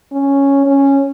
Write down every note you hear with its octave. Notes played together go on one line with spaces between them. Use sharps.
C#4
C#4